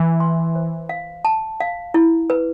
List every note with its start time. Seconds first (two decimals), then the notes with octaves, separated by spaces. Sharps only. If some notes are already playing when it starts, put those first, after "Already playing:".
Already playing: E3
0.20 C6
0.55 C5
0.89 F5
1.25 A5
1.60 F5
1.94 E4
2.30 B4